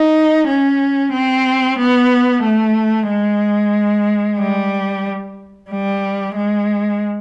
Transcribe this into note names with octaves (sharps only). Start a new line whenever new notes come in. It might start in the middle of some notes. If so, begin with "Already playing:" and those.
Already playing: D#4
C#4
C4
B3
A3
G#3
G3
G3
G#3